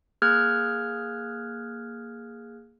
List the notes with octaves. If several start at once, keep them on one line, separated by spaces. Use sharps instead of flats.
A#3 G#4 F6 F#6 G#6